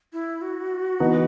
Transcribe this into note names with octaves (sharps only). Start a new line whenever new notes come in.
E4
F#4
E3 B3 D#4